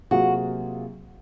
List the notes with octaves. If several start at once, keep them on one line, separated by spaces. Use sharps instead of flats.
C3 F#3 A#3 F4 F#4 G#4